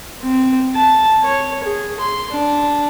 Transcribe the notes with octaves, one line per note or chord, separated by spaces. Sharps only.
C4
A5
C#5
G#4
C6
D4